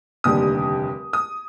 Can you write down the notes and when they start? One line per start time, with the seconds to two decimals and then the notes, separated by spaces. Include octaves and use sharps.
0.24 F1 D#2 D3 G3 D#6
1.13 D#6